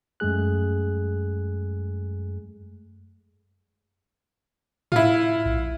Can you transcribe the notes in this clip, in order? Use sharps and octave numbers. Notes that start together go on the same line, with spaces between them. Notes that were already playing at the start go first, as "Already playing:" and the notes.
F#2 G#3 A3 G#4 F#6
A2 E4 F4
A#1